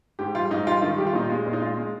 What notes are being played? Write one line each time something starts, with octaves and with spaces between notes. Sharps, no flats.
G#2 G4
G3 F4
G#2 D#4
G3 F4
D#3 F4
G3 G4
F4
A#2 D#4
F4
G#3
A#2
D#4
G#3 F4
G#3